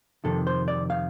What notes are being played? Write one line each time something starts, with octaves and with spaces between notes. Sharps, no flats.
F2 C3 D#3 A4
C5
D5
F5